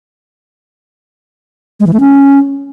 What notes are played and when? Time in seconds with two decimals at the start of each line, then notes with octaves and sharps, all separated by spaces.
1.80 G#3
1.87 E3
1.93 A3
2.00 C#4